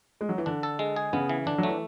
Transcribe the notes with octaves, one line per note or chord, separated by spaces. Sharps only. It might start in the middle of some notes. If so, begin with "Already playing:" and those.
G#3
F#3
E3
D3 D4
A4
G#3
G#4
C#3 B3
E3
D3 D4
F#3
A3
E3